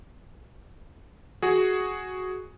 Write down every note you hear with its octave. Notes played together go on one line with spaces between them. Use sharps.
F#4 G#4